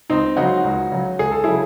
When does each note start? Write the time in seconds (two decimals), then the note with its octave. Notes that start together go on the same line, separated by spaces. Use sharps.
0.10 C#2 C4 D#4
0.37 C#3 F#3 D#4 F#4
0.64 C#2
0.92 C#3 F#3
1.19 C#2 G#4
1.31 A4
1.44 C#3 F#3 E4 G#4